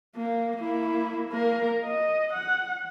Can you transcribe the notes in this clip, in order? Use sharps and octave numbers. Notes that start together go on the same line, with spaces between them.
A#3
A#3 E4
A#3 A#4
D#5
F#5